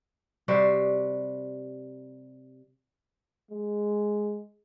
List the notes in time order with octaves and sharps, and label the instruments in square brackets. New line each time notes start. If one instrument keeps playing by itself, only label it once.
[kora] C3 G3 F#4 C5
[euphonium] G#3